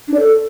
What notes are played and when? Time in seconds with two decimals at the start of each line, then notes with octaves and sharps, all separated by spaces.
0.08 D4
0.14 D5
0.19 A4